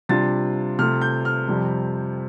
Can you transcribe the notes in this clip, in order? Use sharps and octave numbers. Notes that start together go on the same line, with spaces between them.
C3 G3 D4 F4 A6
C3 A3 F4 F6
G6
F6
F2 C3 G3